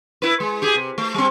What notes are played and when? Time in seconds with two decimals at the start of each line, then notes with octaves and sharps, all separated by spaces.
0.22 E4 B4
0.40 G#3
0.62 G4 G#4
0.75 C3
0.98 A3
1.14 G3 C4